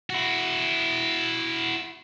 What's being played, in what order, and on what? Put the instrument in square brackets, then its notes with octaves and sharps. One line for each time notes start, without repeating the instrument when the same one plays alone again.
[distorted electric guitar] E4 F#4